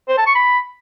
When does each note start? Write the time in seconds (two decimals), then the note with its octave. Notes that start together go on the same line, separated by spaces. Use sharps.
0.09 C5
0.18 A5
0.27 C#6
0.35 B5